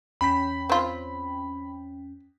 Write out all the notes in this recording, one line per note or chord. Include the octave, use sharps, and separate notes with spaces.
E2 C#4 G5 B5 B6
C4 F4